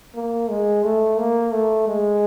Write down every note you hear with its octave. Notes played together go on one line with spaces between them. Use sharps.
A#3
G#3
A3
A#3
A3
G#3